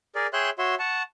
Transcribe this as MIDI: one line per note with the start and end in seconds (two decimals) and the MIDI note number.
0.15 0.27 68
0.15 0.27 70
0.15 0.27 74
0.33 0.50 68
0.33 0.50 73
0.33 0.50 76
0.33 0.50 79
0.33 0.50 84
0.33 0.50 90
0.58 0.75 66
0.58 0.75 73
0.58 0.75 76
0.58 0.75 84
0.79 1.03 78
0.79 1.03 81
0.79 1.03 85